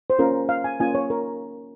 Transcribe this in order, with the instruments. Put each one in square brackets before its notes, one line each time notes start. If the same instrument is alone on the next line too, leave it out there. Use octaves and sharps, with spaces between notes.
[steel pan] C5
A#3 C#4 F4 A#4
F5
G#5
A#3 C#4 F4 G#5
C#5
A#4